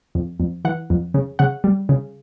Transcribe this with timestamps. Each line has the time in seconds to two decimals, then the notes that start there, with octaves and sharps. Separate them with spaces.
0.15 F2
0.40 F2
0.65 E3 F#5
0.90 F2
1.14 C#3
1.39 C#3 F#5
1.64 G3
1.89 C#3